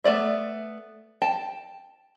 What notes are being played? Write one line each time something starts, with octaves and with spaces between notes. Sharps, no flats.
A3 B3 D5 E5
G5 A5